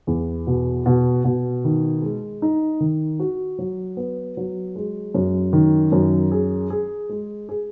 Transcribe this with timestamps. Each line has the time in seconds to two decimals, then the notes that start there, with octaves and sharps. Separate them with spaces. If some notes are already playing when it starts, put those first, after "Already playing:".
0.07 E2
0.47 B2
0.86 B2
1.24 B2
1.64 D#3
2.02 G#3
2.42 D#4
2.80 D#3
3.20 F#4
3.59 F#3
3.97 B3
4.37 F#3
4.76 G#3
5.14 F#2
5.53 D#3
5.92 F#2
6.31 G#4
6.70 G#4
7.09 G#3
7.49 G#4